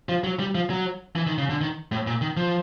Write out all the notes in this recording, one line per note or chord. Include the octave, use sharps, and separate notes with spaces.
F3
F#3
G3
F3
F#3
E3
D#3
C#3
D3
D#3
A2
A#2
D#3
F3